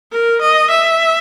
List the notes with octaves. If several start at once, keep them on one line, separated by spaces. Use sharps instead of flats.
A#4
D#5
E5